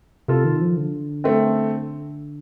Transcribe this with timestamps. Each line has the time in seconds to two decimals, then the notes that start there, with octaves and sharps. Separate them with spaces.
0.28 C3 F4 A4
0.45 D#3
0.61 F3
0.77 D3
1.24 A3 C4